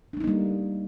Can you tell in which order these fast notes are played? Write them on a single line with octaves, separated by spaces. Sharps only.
D4 A3 D#4 A#3 G3